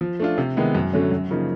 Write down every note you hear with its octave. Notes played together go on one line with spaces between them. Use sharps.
F3
A3 D4 F4
C3
D#3 G#3 B3 E4
F#2
D3 F#3 A3 C#4
F#2
C#3 F3 A#3 D#4